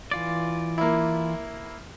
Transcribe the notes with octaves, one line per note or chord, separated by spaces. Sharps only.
E3 F4 D5
A#3 E4